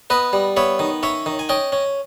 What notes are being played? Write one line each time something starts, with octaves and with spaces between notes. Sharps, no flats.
B3 B4 D#5
G3
B3 C#5 E5
D#3
C#4 C#5 E5
D#3
G#5
C#4 D#5 G5
C#4